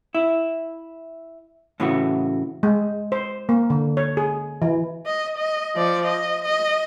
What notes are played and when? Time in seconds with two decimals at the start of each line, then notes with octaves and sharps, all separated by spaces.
0.15 E4
1.80 A2 C#3 E3 A3 F#4
2.63 G#3
3.12 C5
3.49 A#3
3.70 D3
3.97 C#5
4.17 G#4
4.62 E3
5.06 D#5
5.38 D#5
5.76 F3 D5
6.07 D#5
6.45 D#5